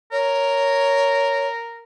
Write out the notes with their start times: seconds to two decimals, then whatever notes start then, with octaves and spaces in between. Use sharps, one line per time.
0.12 A#4 C#5